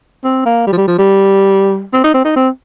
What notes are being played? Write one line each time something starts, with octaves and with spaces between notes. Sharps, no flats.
C4
A#3
G3
F3
G3
F3
G3
C4
D#4
C4
D#4
C4